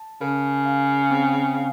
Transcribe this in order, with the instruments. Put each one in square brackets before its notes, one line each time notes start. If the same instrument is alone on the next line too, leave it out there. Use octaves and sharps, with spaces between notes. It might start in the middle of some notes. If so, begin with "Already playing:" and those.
Already playing: [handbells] A5
[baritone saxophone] C#3 [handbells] A#4
[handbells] F5
C4
F5